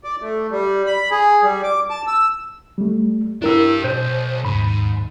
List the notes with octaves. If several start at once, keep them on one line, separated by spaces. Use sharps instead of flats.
D5
A3
G3
B5
G#4
G3
D6
A5
E6
G3 A3
D4 E4 G4 A#4 E6
B1 C5 G6
D#2 G#2 B5